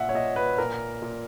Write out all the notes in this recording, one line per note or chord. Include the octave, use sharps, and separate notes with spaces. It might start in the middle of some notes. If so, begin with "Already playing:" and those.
Already playing: A#2 E5 F#5
C#5
A#2 D#5
B4
A#2 A#4
A#2